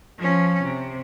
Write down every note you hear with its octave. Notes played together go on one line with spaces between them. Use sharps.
F3 C#4
C3